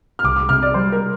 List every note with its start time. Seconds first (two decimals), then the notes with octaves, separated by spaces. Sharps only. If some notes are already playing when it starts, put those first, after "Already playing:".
0.19 F6
0.24 C2 D6
0.36 D6
0.49 C3 F6
0.63 D5
0.74 G3 C5
0.92 A#4